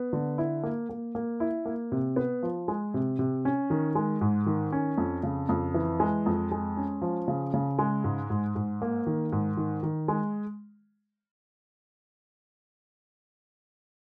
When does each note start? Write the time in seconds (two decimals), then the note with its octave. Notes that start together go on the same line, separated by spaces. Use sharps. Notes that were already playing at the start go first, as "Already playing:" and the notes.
Already playing: B3
0.13 D3
0.38 E4
0.63 A#3
0.89 A#3
1.15 A#3
1.40 E4
1.65 A#3
1.92 C3
2.16 B3
2.43 F3
2.68 G#3
2.94 C3
3.19 C3
3.45 C#4
3.70 D#3
3.95 G#3
4.21 G#2
4.46 D#3
4.72 C#4
4.98 F2
5.23 C#3
5.49 F2
5.74 E3
6.00 G#3
6.26 F2
6.52 G#3
6.77 C#4
7.02 F3
7.28 C#3
7.54 C#3
7.79 G#3
8.04 G#2
8.30 G#2
8.56 G#2
8.82 A#3
9.07 D#3
9.32 G#2
9.57 D#3
9.83 D#3
10.08 G#3